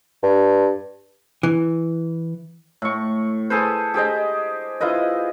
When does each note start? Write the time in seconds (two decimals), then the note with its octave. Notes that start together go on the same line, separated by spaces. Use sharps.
0.23 G2
1.43 E3
2.82 A2 C#6
3.50 G#4 A4 B4 C5
3.94 G4 G#4 C5 D#5
4.81 E4 F4 B4 D#5